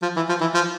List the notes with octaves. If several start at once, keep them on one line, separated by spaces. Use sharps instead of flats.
F3
E3
F3
E3
F3